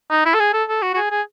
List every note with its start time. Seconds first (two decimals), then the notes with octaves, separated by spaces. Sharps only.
0.11 D#4
0.26 E4
0.34 A4
0.40 G#4
0.54 A4
0.69 A4
0.82 F#4
0.94 F#4
0.97 G#4
1.11 G#4